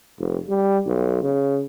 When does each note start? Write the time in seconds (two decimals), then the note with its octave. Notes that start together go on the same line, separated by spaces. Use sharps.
0.19 F1
0.49 G3
0.86 B1
1.23 C#3